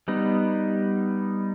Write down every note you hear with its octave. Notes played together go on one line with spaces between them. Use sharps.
G3 B3 D#4